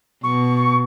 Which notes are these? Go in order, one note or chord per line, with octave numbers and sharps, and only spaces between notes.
B2 C#6